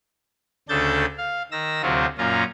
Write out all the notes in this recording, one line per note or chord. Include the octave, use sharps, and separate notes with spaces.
D2 C#3 D4 A4 G6 A6
F5
D#3 E6 A#6
D2 C3 F#3 C4 F4 F#4
F#2 A#2 C#4 F4 A#5